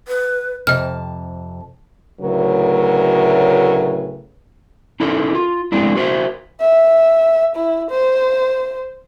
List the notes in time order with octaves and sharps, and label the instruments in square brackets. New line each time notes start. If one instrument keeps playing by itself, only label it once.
[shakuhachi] B4
[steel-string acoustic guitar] F2 C3 A5 [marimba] D#5 F6
[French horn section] D2 A2 C#3 F#3 A#4 B4
[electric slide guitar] C#4 D#4 E4 A4 A#4
F4
G#3 A3 C4 D4 E4
F#4 A#4 C5 D5 E5
[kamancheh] E5
E4
C5